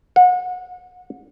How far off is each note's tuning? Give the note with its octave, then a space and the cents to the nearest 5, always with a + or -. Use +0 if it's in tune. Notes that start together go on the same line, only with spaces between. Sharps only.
F#5 -30